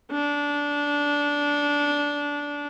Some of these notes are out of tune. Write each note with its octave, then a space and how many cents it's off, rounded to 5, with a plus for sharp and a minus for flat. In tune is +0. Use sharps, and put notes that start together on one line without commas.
D4 -15